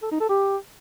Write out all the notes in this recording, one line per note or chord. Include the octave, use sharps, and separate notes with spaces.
A4
D#4
A4
G4